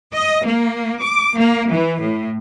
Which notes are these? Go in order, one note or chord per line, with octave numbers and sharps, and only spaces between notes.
D#5
A#3
D6
A#3
E3
A2